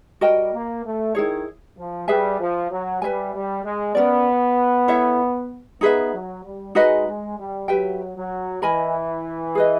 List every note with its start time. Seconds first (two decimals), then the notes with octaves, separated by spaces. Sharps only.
0.21 G3 F#4 A#4 D#5 G5
0.53 A#3
0.84 A3
1.15 D#3 E4 G#4 C#5
1.77 F3
2.08 G3 G#4 B4 E5 G#5
2.39 F3
2.70 F#3
3.01 G3 B4 E5 G#5
3.33 G3
3.64 G#3
3.94 B3 C#4 F#4 A#4 D5
4.88 E4 A4 C#5 E5
5.81 B3 D#4 G#4 B4 E5
6.13 F#3
6.44 G3
6.75 G#3 D#4 F#4 B4 D#5
7.06 G#3
7.37 G3
7.68 F#3 G4 B4 E5 G5
8.16 F#3
8.61 E3 A#4 D#5 G#5 B5
9.55 G#4 B4 D#5